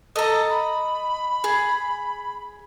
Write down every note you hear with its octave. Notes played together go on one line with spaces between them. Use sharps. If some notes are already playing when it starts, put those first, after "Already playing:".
A4 D#5 A#5
B5
G#4